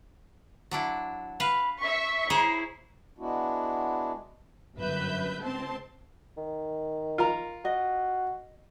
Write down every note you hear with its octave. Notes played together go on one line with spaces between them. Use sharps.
F#3 D4 E4
B4 F5 B5
E5 C#6 B6
E4 G#4 C5 C#5 A#5
G#3 B3 D4 E4 F#4
G1 F#2 B4 E5 G6
C#2 C4 A5 C6
D#3
F4 A#4 A#5
F#4 D#5